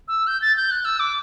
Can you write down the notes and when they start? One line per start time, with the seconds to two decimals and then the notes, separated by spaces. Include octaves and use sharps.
0.08 E6
0.27 G6
0.42 A6
0.57 G6
0.71 F#6
0.85 E6
1.00 D6